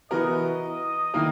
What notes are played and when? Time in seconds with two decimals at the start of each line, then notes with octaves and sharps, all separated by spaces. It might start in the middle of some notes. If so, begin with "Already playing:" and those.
0.11 E3 B3 F#4 A#4 D#5
1.14 D#3 A#3 E4 A#4